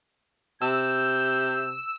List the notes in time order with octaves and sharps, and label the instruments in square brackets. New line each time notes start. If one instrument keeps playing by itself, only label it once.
[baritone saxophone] C3 [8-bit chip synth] E6 [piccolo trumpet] G6